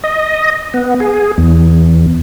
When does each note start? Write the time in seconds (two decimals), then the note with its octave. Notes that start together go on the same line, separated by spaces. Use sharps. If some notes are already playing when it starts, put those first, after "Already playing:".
0.04 D#5
0.74 B3
1.00 G#4
1.38 E2